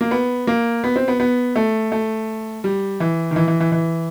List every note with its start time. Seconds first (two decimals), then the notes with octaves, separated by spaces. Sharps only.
0.01 A#3
0.11 B3
0.47 A#3
0.84 B3
0.96 C4
1.08 B3
1.20 B3
1.56 A3
1.92 A3
2.64 G3
3.00 E3
3.31 D#3
3.36 E3
3.48 E3
3.60 E3
3.72 E3